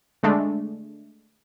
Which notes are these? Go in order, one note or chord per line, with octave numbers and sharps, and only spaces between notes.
D3 G#3 A3 D4